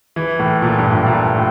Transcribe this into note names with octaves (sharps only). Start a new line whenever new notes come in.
E3
A2
A#2
G2
A2
A#2
A2